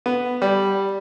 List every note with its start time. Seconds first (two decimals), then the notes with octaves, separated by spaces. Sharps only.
0.06 B3
0.42 G3